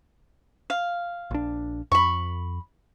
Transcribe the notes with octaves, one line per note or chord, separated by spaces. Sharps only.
F5
A#1 D4
F2 B5 C#6